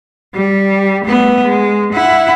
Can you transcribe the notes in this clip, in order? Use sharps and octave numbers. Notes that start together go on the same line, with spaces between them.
G3
A3 B3
G#3
E4 F#5